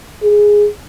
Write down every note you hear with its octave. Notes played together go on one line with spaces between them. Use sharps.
G#4